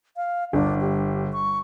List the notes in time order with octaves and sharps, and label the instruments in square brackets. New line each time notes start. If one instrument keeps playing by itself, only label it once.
[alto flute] F5
[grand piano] G1 [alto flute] D4
[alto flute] G4
C#6